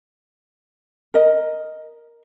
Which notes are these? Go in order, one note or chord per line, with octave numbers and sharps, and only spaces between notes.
A#4 D#5